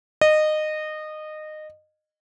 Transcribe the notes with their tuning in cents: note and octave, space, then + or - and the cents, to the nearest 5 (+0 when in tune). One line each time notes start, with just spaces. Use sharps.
D#5 -20